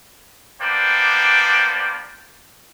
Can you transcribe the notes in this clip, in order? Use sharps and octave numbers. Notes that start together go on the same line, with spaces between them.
A#3 B3 D4 C5 D5 G5